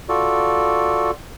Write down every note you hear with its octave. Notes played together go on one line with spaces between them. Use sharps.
F4 F#4 A4 D5